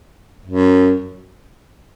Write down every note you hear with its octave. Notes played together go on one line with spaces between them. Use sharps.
F#2